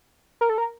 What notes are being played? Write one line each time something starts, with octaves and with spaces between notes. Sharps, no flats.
A#4
A4
A#4